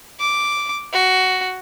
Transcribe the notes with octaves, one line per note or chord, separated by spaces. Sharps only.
D6
F#4